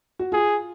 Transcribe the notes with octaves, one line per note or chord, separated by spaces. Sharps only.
F#4
F4 G#4